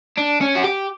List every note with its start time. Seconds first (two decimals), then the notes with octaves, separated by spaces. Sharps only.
0.18 D4
0.41 C#4
0.55 F#4
0.63 G4